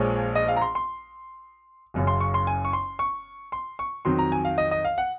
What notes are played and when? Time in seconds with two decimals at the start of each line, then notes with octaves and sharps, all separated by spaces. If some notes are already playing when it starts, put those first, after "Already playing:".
Already playing: A#1 A#2 F3 G#3 C#5
0.35 D#5
0.48 F5
0.57 A#5
0.62 C6
0.75 C6
1.94 F#1 F#2 C#3
2.07 C6
2.20 C#6
2.34 C6
2.47 G#5
2.65 C#6
2.73 C6
2.99 C#6
3.52 C6
3.79 C#6
4.05 F2 D#3 F#3 C6
4.19 A#5
4.32 G#5
4.45 F5
4.58 D#5
4.71 D#5
4.85 F5
4.98 F#5